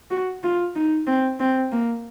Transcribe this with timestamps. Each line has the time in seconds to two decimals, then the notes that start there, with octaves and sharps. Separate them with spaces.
0.11 F#4
0.43 F4
0.75 D#4
1.07 C4
1.40 C4
1.72 A#3